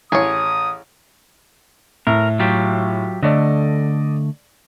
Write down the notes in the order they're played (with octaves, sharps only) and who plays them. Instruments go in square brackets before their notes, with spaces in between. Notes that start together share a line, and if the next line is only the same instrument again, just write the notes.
[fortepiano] A1 [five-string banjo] G#4 C#5 [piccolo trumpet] D#6
[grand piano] A2 [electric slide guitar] A#4
[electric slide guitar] F#3 F4 G4
[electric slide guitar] D3 A3 [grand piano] D5 D#5